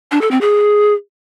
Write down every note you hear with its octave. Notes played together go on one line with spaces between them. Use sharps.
D4
A4
C4
G#4